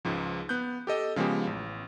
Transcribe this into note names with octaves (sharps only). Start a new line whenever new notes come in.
C#2 G#2 F3
B3 F#6 G6
G4 A4 D#5
C#3 F3 G#3 B3 G4
A1